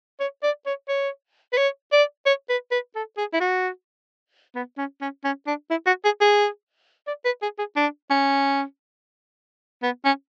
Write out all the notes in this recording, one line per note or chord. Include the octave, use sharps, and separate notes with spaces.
C#5
D5
C#5
C#5
B4
C#5
D5
C#5
B4
B4
A4
G#4
E4
F#4
B3
C#4
C#4
C#4
D4
E4
F#4
G#4
G#4
D5
B4
G#4
G#4
D4
C#4
B3
C#4